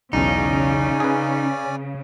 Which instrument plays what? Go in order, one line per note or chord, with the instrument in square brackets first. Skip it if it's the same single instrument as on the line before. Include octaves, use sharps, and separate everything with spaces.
[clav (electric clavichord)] B1 E2 [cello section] C#3 [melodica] C#4 D5 [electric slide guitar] D#4
[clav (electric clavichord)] G#4 B4